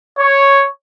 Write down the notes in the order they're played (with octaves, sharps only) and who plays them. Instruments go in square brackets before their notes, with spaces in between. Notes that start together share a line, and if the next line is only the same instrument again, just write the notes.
[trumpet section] C#5